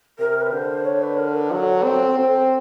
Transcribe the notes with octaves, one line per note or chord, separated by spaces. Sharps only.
C3 A#4
B4
D3 C5
C#5
B4
A#4
B4
F#3 A4
C4
C4